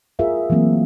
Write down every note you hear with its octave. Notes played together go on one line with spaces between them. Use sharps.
F4 G#4 A#4 E5 F5
E3 F#3 A3 A#3 C4